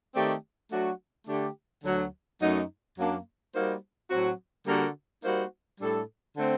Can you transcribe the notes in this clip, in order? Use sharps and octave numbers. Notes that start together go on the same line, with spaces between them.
D#3 A3 C4 G4 D5
F#3 A3 D4 F#4
D3 A3 D4 G4
D2 D3 F#3
F#2 F#3 A3 D#4
F#2 F#3 A#3 D4
G3 A#3 D#4 F#4 C5
A2 F#3 C4 F#4
D3 G3 A#3 F#4 A#4
G3 A#3 D#4 F#4 C5
A2 G3 D4 A4
D3 A3 C4